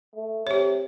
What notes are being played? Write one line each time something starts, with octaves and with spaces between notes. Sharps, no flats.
A3
C3 G4 C#5